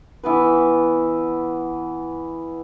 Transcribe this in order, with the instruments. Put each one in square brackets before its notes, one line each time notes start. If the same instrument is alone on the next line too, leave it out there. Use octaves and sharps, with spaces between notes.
[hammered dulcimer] E3 B3 B4